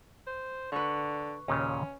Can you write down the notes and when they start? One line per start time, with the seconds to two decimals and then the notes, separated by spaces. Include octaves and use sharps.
0.27 C5
0.72 D3 B4 C#6
1.48 D#2 A#2 C#3 C#4